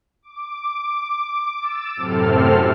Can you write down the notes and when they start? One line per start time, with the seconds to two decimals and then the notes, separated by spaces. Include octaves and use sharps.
0.22 D6
1.60 E6 A6 D7 E7
1.96 F#2 A2 C3 C4 A4 F6